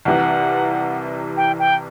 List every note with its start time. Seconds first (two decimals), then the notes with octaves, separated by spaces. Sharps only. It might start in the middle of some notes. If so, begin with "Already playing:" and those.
0.05 C2 C3 E3 F#5
1.37 G5
1.59 G5